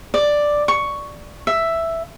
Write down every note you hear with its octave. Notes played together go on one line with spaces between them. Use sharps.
D5
C#6
E5